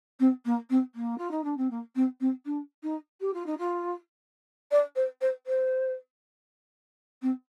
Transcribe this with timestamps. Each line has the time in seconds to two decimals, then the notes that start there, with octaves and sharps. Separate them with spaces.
0.20 C4
0.45 A#3
0.70 C4
0.95 A#3
1.18 F4
1.31 D#4
1.44 D4
1.57 C4
1.71 A#3
1.95 C4
2.21 C4
2.45 D4
2.83 D#4
3.21 G4
3.34 F4
3.46 D#4
3.58 F4
4.71 D5
4.96 C5
5.21 C5
5.47 C5
7.22 C4